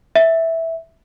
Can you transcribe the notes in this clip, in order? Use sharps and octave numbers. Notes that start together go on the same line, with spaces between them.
E5